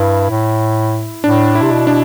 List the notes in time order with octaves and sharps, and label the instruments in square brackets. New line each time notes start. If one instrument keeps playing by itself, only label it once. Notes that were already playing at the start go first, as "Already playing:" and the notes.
Already playing: [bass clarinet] G2 [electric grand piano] E4
[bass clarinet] A2
[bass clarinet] A2 [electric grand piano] D4
[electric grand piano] E4
[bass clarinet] C3
B2
[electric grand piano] D4